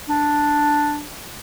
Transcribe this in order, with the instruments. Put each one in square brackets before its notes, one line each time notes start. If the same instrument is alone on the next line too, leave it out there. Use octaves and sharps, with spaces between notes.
[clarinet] D4